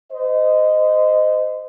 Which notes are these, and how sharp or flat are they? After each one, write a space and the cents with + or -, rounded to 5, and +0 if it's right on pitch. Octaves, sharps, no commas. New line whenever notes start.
C5 -30 D#5 -10